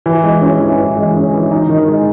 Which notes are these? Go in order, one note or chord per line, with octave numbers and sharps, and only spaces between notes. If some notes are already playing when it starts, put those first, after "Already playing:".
E3
G#3
C#4
E3
E3
G#3
C#4
E3
D#4
D#3
G#3